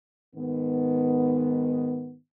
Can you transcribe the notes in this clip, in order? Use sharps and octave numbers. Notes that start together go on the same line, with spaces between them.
G#2 D#3 B3